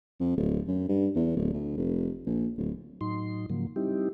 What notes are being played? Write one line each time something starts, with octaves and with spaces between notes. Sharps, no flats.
F2
D1
F#2
G2
E2
D1
D2
F1
A#1
D1
A2 F#3 D#4 C6
G#2 C#3 F3 F#3 A#3
G3 C4 D#4 E4 G4